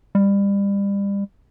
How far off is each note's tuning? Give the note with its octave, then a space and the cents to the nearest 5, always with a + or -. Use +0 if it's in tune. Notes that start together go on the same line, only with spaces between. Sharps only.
G3 +30